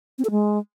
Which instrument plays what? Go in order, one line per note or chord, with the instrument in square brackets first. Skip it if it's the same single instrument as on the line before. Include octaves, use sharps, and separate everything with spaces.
[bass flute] C4
A4
G#3